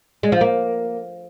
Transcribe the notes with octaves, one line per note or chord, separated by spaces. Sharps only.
G#3
F3
A#3